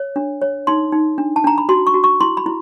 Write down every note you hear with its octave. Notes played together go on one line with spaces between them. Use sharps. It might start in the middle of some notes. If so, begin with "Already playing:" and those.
Already playing: C#5
D4
C#5
D#4 C6
D#4
D4
A5
D4 A#5
B5
F#4 C6
C#6
F#4
C#6
E4 C6
B5
E4